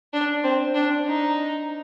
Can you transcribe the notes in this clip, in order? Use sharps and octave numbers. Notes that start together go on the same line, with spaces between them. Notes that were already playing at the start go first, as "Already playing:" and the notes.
D4
C4
D4
D#4